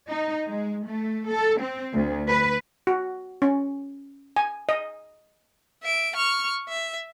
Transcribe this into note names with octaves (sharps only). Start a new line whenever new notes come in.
D#4
G#3
A3
A4
C4
D2
B4
F#4
C#4
G#5
D#5
E5 D7
C#6 F6
E5